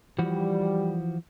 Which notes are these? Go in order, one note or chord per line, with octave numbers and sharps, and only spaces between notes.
E3 F3 G3 F#4